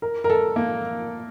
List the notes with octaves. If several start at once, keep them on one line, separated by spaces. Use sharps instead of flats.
A#4
A#4
A4
A#3